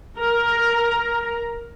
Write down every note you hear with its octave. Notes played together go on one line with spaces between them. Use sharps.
A#4 A#5